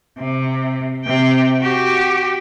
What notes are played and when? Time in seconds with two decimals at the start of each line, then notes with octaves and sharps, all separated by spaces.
0.18 C3
1.05 C3 G5
1.59 F#4 G4